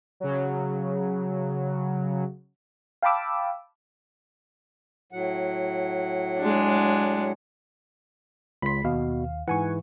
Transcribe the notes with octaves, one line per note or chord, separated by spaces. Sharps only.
C#3 F#3
F5 G5 A5 B5 D6 E6
A2 F#3 F#5
G#3 D4
C#2 B5 C6 B6
D#2 B2 F5
G#2 E3 F#5 G#5 C#6